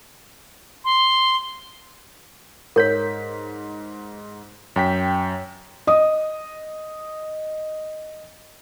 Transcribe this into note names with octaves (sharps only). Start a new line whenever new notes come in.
C6
G#2 A#4 C#5 B6
F#2 G5 B6
D#5 D#6